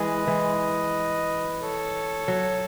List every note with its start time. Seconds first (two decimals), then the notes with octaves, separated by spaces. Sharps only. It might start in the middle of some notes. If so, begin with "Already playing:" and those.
Already playing: E3 G#3 B4 D#5
0.27 E3 G#3
1.60 A4 C#5
2.28 F#3